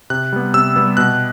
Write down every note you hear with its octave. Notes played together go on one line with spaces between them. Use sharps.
C3 F#6
G3 B3
C3 E6
G3 B3
B2 F#6